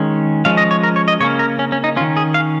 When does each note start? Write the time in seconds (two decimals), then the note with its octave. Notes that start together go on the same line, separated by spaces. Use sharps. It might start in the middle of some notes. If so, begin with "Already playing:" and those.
Already playing: D#3 G#3 C#4
0.45 F3 G#3 C#4 F5
0.57 D#5
0.71 C#5
0.83 A#4
0.96 C#5
1.08 D#5
1.20 C#3 A#3 C#4 C#5
1.39 A#4
1.59 C#4
1.72 C#4
1.84 D#4
1.96 C#4 F4
2.01 D#3
2.17 G#4
2.34 F5